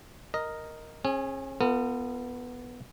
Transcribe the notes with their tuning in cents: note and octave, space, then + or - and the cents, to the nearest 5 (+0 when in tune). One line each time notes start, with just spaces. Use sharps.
A#4 +0 D#5 +0
C#4 -40 G#4 +5
B3 +0 F4 +0 A#4 -45